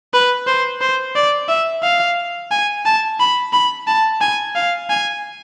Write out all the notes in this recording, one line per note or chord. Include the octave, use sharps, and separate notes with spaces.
B4
C5
C5
D5
E5
F5
G#5
A5
B5
B5
A5
G#5
F5
G#5